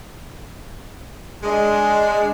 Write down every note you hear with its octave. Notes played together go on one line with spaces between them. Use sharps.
G#3 D4